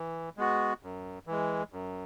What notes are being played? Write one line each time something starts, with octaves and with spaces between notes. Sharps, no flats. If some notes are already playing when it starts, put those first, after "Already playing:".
Already playing: E3
G#3 B3 F#4
F#2
E3 G#3
F#2